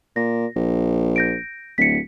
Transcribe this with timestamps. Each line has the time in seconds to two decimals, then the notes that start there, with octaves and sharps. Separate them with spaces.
0.16 A#2 A#6
0.56 A#1
1.16 G6 A#6 D7
1.78 D1 B6 C#7